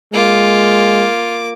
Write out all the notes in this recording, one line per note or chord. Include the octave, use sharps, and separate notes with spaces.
G#3 A#3 F4 D6